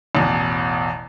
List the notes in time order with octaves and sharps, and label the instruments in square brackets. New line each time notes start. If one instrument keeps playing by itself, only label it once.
[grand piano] A1 E2 B2